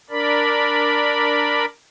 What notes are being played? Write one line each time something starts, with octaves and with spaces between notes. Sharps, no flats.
D4 A#4 D5 B5